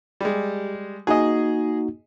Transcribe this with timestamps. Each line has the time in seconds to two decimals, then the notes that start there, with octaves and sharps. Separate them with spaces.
0.21 G3 G#3 G4
1.07 A#3 D#4 F#4 G#4 D#5